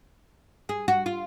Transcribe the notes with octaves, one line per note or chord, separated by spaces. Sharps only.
G#4
F#4
F4